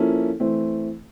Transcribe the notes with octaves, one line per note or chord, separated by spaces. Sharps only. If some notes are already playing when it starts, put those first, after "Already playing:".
Already playing: F3 A#3 C#4 E4 A4
E3 A3 C4